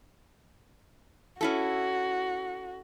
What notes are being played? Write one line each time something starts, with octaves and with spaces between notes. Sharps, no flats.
C#4 E4 F#4 A4